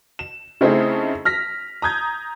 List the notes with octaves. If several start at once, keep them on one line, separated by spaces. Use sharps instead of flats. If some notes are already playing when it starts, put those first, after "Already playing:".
E7
C#3 A3 C4 D#4 E4 G#4
F6 A#6 B6
A#5 D#6 G6 G#6